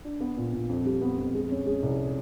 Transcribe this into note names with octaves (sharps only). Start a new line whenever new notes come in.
D4
B3
A#2
A#2
F2
G3
B3
F2
G#3
C#4
G#3
C2